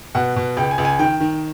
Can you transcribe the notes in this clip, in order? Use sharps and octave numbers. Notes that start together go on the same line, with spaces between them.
B2 F#5
B2
C#2 G5
G#5
C#2
G#5
D#3 G5
D#3